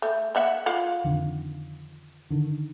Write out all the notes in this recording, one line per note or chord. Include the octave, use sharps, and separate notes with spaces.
A3
A#3 E5 F#5
F4 F5 F#5
F2 D3 D#3
D3 D#3